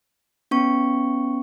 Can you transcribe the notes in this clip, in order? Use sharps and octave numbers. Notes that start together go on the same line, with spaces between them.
B3 C#4 C#6